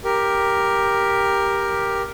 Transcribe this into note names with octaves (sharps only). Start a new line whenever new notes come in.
G4 A#4